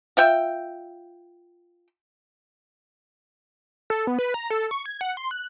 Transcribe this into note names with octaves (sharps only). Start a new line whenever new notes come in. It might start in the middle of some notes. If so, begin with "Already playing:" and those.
F4 E5 G5
A4
B3
B4
A#5
A4
C#6
G#6
F#5
C6
F#6